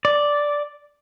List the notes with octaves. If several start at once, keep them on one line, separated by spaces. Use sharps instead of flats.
D5